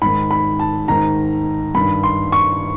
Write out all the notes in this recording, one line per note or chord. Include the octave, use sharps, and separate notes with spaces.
G#2 D#3 B5
B5
A5
G#2 D#3 A#5
G2 D#3 B5
C6
C#6